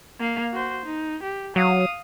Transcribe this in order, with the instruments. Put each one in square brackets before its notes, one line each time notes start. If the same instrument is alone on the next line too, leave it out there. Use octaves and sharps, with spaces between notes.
[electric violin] A#3 F5
F#4 C5
D#4
G4
[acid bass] F#3 [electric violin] F5 D#6